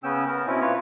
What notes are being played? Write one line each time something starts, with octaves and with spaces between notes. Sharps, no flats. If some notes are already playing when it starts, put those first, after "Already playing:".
C#3 B3 C#4 G5 E6
B3 A#4
B2 C4 C#4 E4
A#3 F4 B4 C#5